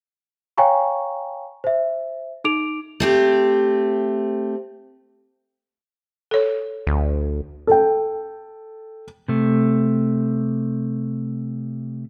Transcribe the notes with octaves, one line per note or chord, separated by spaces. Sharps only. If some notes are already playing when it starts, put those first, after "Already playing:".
C#5 F5 G5 G#5 A#5 C#6
C5 E5
D#4 D6 D7 F7
A3 C4 G4
A4 C#5
D2
A4 G5
C3 A3